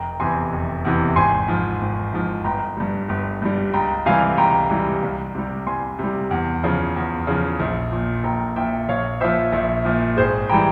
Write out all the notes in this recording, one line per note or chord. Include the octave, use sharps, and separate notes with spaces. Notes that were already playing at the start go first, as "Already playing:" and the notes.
Already playing: F1 G5 A#5
E2 C3 E3 G#5 C6
F1
E2 C3 E3
G#1 G#5 C6
G#2 F3
G#1
G#2 F3
G1 G5 A#5
G2 G3
G1
G2 G3
C#2 G5 A#5
C3 E3 G3 F5 G#5
C#2 G5 A#5
C3 E3 G3
C2
C3 G3
C2 G#5 C6
C3 G3
E2
C#3 F3
E2
C#3 F3
A#1
A#2 F3
A#1 G5 A#5
A#2 F3 E5 G5
A#1 C#5 F5
A#2 F3 C5 E5
A#1
A#2 F3
G#1 G#4 C5
E3 G3 G5 A#5